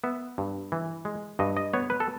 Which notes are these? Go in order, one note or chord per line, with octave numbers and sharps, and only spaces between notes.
B3 E5
G2
E3
G#3
G2 D#5
D#5
B3 C#5
B4
A4